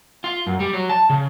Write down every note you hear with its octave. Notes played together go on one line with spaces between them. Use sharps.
F4
F#2
G3
F#3
A5
C#3